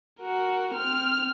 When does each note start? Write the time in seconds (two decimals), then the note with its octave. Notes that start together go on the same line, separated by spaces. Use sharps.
0.21 F#4 A#4
0.74 C4 F6